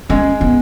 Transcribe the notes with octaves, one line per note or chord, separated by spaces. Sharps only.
G#3 C#4 G#4
B3